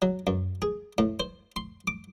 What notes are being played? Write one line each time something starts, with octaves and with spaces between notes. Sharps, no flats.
F#3
F#2
G#4
A2
C5
C6
D6